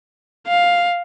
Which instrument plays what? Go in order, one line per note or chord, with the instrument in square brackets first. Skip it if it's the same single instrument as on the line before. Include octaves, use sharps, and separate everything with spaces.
[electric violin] F5